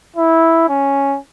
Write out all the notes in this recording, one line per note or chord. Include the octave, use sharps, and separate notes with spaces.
E4
C#4